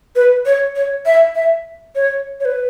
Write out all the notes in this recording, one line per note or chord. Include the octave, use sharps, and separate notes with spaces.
B4
C#5
C#5
E5
E5
C#5
C#5
B4